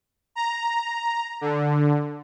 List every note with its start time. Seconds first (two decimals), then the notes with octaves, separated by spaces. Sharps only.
0.35 A#5
1.41 D3